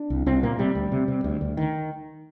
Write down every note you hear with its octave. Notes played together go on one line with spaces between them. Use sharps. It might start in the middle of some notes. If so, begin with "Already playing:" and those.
Already playing: D4
C2
C2 C4
A#2 A#3
C3 G3
D2
C3
C3
D2
D2
D#3